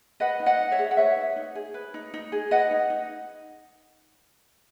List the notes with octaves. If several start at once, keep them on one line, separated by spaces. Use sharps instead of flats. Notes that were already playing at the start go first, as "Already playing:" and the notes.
B4 D#5 F#5
D#4
D#5 F#5
D#4
C#5 E5
G#4
F#5
B4 C#5 E5
D#4
D#4
G#4
B4
D#4
D#4
G#4
B4 D#5 F#5
D#4
D#4